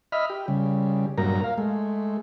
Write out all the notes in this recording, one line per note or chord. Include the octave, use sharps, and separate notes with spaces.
D#5 E5 B5 F6
G4
C#3 G3
G2 A#2 F#3 A#4 A#5
F5
G#3 A3